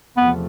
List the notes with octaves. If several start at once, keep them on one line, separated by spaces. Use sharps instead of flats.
E2 C3 F3 A3 B3